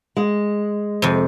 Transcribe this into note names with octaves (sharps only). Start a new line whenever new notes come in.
G#3
F2 C3